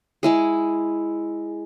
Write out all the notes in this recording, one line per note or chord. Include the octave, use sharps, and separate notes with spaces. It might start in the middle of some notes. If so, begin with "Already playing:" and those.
G#3 E4 G#4